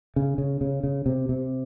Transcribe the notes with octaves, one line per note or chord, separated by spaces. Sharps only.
C#3
C#3
C#3
C#3
C3
C3